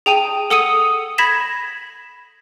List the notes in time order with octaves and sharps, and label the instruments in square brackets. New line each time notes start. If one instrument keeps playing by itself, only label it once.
[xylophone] G#4 G5 A5 D#7
A4 F#5 D#6 E6 C#7 D#7
B5 G#6 A#6 B6 E7